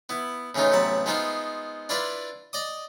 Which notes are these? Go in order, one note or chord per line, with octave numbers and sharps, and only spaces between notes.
B3 E4
A2 C#3 E3 D#4 F4
A1 C3 F#3 B3 A5 B5
G#3 B3 D#4 F4 C5 E5
D4 E4 F4 B4 D5
D5 D#5 D6 D#6